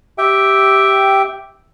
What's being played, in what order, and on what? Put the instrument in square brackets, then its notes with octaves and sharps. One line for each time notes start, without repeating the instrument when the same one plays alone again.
[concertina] G4 E5 G5